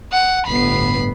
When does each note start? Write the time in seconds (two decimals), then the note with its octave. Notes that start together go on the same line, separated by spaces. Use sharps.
0.12 F#5
0.47 G1 A2 B3 B5 C7